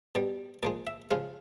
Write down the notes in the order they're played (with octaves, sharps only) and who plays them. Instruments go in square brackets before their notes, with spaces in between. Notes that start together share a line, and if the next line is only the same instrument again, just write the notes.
[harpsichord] B2 G3 D5
A#2 F3 G#3 D5
E5
C#3 F3 G#3 F5